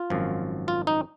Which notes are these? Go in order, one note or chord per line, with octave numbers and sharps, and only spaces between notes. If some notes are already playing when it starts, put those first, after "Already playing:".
Already playing: F4
G#1 F#2 F3
F4
D#4